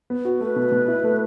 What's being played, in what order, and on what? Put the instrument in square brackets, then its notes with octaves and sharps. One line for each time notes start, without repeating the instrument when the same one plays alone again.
[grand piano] B3
F#4
[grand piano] A3 [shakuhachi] B4
[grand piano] B2
B2
E4
A3